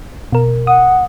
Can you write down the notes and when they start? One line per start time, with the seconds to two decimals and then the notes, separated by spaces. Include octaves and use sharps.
0.32 B2 A#4
0.67 F#5 D#6